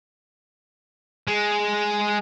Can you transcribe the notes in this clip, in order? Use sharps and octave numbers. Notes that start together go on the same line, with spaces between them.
G#3